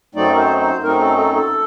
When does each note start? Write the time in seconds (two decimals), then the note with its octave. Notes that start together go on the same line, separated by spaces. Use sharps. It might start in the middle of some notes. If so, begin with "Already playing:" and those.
0.15 F#2 F#3 A3 C4 D#4 D5
0.32 A#4
0.39 C5
0.61 C5
0.83 F#2 F#3 A3 C4 D#4 A#4
1.01 A4
1.18 A4
1.35 A4